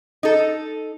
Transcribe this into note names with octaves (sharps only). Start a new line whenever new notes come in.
D#4 A4